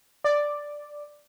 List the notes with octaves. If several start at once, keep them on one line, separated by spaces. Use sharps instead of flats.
D5